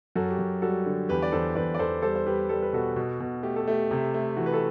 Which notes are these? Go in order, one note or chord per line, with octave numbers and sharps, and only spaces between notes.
F#2 F#4 A4
G4
F#2
G3 F#4 A4
D3
E2 G4 B4
D5
E2 A4 C5
E2 B4 D5
D5
E2 A4 C5
G3 A4 C5
C5
G3 G4 B4
G3 A4
B4
B2 F#4 A4
B2
B2
A3 G4
A4
A3 G4
C3
A3
E3 F#4
B4
A4